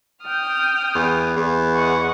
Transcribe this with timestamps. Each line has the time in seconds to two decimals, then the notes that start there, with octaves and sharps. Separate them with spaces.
0.23 G5 D#6 F6
0.95 E2
1.36 E2
1.76 D#5 F#5 C#6